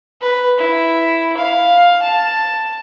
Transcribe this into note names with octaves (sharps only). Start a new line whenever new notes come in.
B4
E4
F5
A5